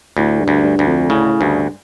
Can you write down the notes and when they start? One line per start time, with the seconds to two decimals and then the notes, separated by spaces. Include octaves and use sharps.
0.17 D2 A2
0.40 G2
0.48 D2
0.63 G2
0.79 D2
0.87 F2
1.10 A2 C#3
1.41 D2 G2